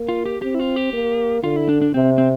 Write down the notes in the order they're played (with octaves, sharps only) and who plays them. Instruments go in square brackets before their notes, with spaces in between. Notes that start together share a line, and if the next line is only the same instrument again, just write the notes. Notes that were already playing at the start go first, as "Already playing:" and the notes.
Already playing: [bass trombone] A#3
[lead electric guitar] F4
G4
[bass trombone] C4 [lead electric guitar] G4
[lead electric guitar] E4
F4
G4
[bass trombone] A#3
[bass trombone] D3 [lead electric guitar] F4
[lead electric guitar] E4
D4
D4
[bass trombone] C3 [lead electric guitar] C4
[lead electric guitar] C4